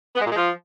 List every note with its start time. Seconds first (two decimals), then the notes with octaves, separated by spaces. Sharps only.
0.16 B3
0.21 G#3
0.26 A#2
0.31 G#3
0.36 F3